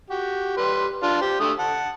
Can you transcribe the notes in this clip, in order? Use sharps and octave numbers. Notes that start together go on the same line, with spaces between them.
F#4 G4
G3 B4 C6
D4 F4 C6
G4 C5
D3 A3 D#6
F#5 A5